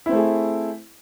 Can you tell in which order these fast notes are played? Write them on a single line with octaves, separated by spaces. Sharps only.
E4 C4 A3 G#4